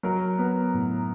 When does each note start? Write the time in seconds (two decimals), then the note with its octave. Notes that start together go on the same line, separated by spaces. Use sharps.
0.03 F#3 A#4
0.38 B3
0.74 A2